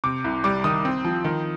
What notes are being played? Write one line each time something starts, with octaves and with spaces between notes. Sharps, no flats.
C3 D6
C2
G3 D6
D#3 D#6
C4
F3
D#3